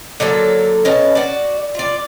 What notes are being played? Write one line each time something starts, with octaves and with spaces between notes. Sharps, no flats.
D3 F#3 A#3 A4
B2 C#4 A5
F#4 D5
F4 D5